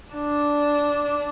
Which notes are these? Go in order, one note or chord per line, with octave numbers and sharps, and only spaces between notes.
D4